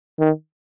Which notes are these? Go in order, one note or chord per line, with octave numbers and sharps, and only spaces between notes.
D#3